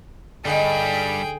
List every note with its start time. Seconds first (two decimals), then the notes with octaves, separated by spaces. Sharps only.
0.45 G2 D3 G3 D4 D#4 G#4 G5